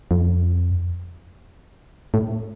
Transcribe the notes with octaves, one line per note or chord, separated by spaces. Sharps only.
F2
A2